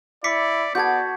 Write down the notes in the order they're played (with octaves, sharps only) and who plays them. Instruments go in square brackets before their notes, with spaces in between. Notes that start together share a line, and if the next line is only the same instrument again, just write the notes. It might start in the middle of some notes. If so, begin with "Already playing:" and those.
[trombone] E4 [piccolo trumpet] D5 [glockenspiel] D6 B6 C#7
[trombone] B3 [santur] F#4 A4 [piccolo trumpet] D5 [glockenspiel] G6 G#6